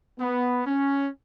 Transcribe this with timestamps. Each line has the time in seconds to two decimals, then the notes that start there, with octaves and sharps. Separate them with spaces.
0.20 B3
0.66 C#4